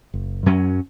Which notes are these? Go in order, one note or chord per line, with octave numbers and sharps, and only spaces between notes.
F#1
F#2 F#3 C#4